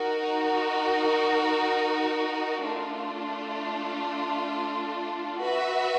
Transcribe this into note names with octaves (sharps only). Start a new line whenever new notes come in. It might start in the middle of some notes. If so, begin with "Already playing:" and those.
Already playing: D#4 F#4 A#4
A3 D4 F4
F#4 B4 E5